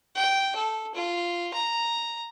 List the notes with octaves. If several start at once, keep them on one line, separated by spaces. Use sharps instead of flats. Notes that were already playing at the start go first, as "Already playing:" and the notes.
G5
A4
F4
A#5